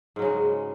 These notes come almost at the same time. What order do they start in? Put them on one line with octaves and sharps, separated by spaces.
G#2 F#3 C#3 G#3